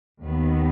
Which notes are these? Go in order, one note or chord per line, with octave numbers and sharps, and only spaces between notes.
D#2 D#3 B3